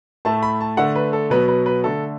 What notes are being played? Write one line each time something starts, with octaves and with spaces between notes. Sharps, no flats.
A2 A3 A5
B5
A5
D3 A3 F#5
B4
A4
B2 F#3 B3 B4
B4
B4
D3 A3 A4